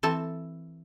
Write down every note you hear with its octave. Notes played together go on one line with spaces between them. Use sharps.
E3 C4 A4 A5